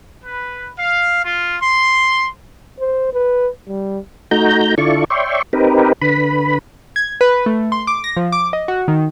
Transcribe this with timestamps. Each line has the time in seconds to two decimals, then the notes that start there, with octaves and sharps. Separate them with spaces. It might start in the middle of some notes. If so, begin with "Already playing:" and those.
0.24 B4
0.76 F5
1.24 F4
1.60 C6
2.80 C5
3.14 B4
3.68 G3
4.31 A3 D#4 F#4 A#5 G6
4.78 D3 E4 F4 A4 D5 C#6
5.10 C#5 D5 E5 G5 C6 C#6
5.53 C4 D#4 G4 A#4 B4
6.02 D3 B4 B5
6.96 G#6
7.21 B4
7.46 A3
7.72 C6
7.87 D6
8.04 A#6
8.17 F3
8.32 D6
8.53 D#5
8.68 F#4
8.88 D#3